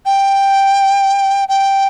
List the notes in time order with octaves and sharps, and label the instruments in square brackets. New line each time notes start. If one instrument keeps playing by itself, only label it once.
[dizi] G5
G5